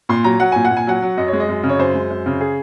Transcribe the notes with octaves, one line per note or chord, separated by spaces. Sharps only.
A#2 C6
F#3 A#5
F#3 F#5
A#2 G#5
F#5
A#2
G#5
F#3 F#5
F#3
F#2 D#5
C#5
G#3
D#5
F#2
C#3
C#5
F#2 C5
G#3
F#2
C#3
G#4